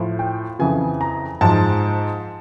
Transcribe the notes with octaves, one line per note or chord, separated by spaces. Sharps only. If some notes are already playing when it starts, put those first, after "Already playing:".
Already playing: A2 F3
G5
F2 C#3 E3 G#5
A#5
G#2 F3 A5